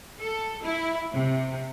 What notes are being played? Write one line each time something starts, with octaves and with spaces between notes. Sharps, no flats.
A4
E4
C3